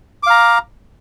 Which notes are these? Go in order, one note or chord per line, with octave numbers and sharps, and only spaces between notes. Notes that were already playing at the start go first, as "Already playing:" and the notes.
F5 A#5 D6